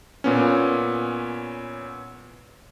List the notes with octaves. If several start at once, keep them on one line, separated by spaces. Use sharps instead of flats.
A#2 B3 C#4